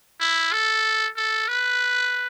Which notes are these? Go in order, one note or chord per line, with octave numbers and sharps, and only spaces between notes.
E4
A4
A4
B4